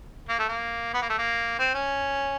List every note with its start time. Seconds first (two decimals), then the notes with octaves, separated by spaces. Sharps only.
0.29 A#3
0.39 A3
0.49 A#3
0.94 B3
1.02 A#3
1.09 A3
1.18 A#3
1.59 C4
1.74 C#4